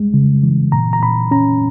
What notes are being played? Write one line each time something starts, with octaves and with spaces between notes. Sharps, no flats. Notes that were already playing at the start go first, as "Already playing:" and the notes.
Already playing: G3 G#3
C#3
E3
A#2 A#5
A#5
A#2 B5
C#4 A#5